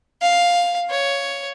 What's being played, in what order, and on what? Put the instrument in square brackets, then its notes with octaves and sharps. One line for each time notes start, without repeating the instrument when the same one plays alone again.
[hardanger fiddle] F5
C#5